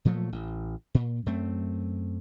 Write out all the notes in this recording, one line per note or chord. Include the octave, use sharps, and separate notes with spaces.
A#2 F3 F#3 A3
A1
A#2
F#2 A3 C4